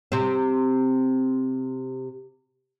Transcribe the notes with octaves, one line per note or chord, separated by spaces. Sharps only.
C3 C4